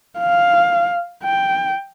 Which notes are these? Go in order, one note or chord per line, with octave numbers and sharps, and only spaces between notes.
F5
G5